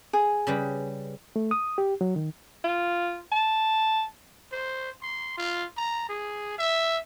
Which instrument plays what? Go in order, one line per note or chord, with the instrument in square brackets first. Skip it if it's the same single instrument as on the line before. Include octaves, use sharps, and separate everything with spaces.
[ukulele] G#4
[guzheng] C#3 G3 B4
[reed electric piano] A3
D#6
G4
F#3
D#3
[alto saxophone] F4
A5
[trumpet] C5
C6
F4
A#5
G#4
E5